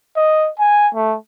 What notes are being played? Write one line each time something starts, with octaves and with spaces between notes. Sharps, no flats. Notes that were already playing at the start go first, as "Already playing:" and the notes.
D#5
G#5
A3